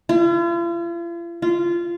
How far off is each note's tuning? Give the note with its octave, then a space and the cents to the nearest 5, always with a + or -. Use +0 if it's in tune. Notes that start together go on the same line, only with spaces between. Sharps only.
F4 -45
F4 -20